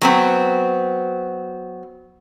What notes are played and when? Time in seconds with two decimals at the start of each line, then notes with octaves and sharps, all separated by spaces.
0.02 F#3 B3 C4